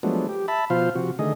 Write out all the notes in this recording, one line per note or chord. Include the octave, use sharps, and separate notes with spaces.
F3 F#3 G#3 A3 B3 D4
G4
E5 A5 B5
B2 F3 F4 C5 F5
C3 F3 F#4
D3 D#3 A3 G#4 D#5